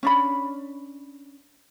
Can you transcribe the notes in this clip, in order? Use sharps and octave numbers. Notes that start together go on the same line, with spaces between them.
C#4 D4 B5